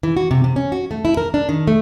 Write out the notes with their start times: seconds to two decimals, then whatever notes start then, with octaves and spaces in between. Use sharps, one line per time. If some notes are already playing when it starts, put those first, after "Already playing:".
0.03 E3
0.17 F#4
0.31 C3
0.44 C3
0.56 C#4
0.72 F#4
0.91 A3
1.05 E4
1.17 A#4
1.34 D4
1.49 D#3
1.67 A3